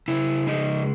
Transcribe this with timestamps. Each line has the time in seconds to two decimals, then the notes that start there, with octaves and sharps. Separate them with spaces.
0.08 C#3 E4
0.47 G#3 D#4